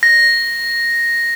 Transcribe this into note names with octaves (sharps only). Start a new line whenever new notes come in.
A#6